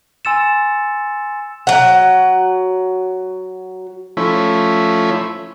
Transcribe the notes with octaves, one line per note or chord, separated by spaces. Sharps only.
G#5 C6 E6 A6 C#7 E7
F#3 F#5
F3 A3 C#4 E4